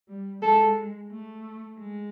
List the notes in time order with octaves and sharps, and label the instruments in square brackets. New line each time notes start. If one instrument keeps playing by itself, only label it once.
[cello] G3
[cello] G#3 [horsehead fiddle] A4
[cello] A3
G#3